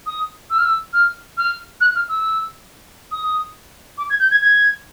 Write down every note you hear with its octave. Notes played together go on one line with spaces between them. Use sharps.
D#6
E6
F6
E6
F6
F6
F#6
F6
E6
D#6
D6
G#6
G6
G#6
G#6